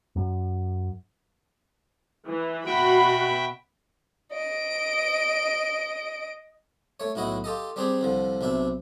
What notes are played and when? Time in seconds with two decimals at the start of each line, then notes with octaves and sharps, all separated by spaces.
0.16 F#2
2.27 E3
2.66 B2 F#4 E5 G5 B5
4.33 D#5 D7
7.00 A3 C#5
7.15 B1 A2 E4 F#4 D#5
7.44 F4 G4 A4 D#5
7.76 G3 C4 D4 G4 G#4
8.01 C2 D3 F3
8.41 B1 C3 D4 E5